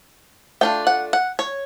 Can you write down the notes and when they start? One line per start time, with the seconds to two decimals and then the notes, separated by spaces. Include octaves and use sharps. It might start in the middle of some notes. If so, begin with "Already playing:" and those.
0.61 A3 D4 F4 G5
0.87 F#5
1.13 F#5
1.39 C#5